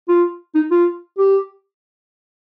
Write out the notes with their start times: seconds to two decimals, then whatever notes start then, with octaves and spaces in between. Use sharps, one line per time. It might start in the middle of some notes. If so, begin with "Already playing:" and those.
0.09 F4
0.55 D#4
0.71 F4
1.18 G4